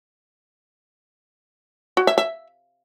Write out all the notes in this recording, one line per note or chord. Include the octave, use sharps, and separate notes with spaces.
F#4
E5
E5